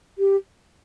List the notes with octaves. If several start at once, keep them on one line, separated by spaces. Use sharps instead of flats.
G4